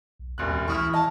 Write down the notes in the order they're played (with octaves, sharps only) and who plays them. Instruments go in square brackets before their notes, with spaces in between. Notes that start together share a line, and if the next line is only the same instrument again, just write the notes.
[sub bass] B1
[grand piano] E1 A1 F#6 [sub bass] D#2
[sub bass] C#2
[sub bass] E3 [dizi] E4 [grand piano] C#6 D#6 F6
[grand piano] D#5 [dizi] A5